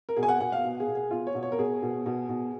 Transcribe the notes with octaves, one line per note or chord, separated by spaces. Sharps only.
A#4
B2 G#4
G#5
F#5
B2 F#5
F5
B2
G#4
B2
G#4
B2 F4
C#5
B2
C#5
A#4
B2 G#4
B2
B2
B2